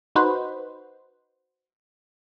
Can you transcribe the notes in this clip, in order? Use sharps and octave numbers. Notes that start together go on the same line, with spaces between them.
D#4 F#4 B4 C5